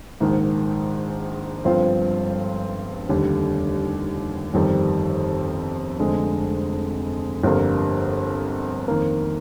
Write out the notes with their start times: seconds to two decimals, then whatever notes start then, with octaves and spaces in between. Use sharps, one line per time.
0.20 A#1 G#2 D#3
1.65 G1 G2 F3 C4 F4
3.09 F1 D#2 D3 G3
4.54 G1 F2 D#3 G3 C4
5.99 F1 F2 D3 G#3
7.43 G1 F2 D3 G3 A#3
8.88 F2 D#3 A#3